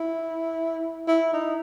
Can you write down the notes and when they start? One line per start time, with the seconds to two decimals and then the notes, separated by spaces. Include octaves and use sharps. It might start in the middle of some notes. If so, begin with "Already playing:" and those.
Already playing: E4
1.08 E4
1.33 D#4